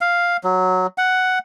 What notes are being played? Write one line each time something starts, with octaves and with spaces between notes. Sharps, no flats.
F5
F#3
F#5